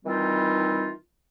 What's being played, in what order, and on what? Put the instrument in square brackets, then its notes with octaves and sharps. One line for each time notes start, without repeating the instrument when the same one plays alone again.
[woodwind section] D#3 E3 G3 C4 D#4 F4